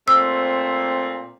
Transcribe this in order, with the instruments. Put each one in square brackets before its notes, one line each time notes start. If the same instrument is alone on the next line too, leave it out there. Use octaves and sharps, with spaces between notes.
[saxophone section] A#2 A3 C4 [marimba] E6